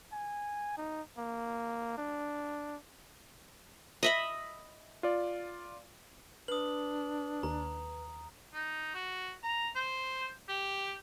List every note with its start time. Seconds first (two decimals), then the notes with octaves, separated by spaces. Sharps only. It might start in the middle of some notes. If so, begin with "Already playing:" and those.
0.12 G#5
0.77 D#4
1.18 A#3
1.97 D4
4.03 D#5 E5 B5
5.03 F4 D5
6.48 D4 B4 D#6 F#7
7.43 D#2 A#5
8.54 D#4
8.95 F#4
9.43 A#5
9.76 C5
10.49 G4